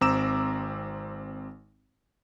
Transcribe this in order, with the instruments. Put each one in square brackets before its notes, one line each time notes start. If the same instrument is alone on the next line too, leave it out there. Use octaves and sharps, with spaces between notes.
[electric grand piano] G#1 C4 A#5 D6 E6 E7